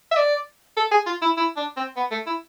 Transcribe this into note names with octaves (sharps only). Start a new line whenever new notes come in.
E5
D5
A4
G#4
F4
E4
E4
D4
C4
B3
A3
E4